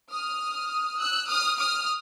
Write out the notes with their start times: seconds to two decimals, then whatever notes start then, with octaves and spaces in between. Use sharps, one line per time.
0.10 D#6 F6
0.98 E6 F#6
1.28 D#6 F6
1.57 D#6 F6